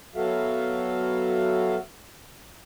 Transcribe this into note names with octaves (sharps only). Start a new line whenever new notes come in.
F#3 B3 F#4 A4 E5 F5